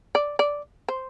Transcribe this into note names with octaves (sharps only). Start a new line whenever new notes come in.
D5
D5
C5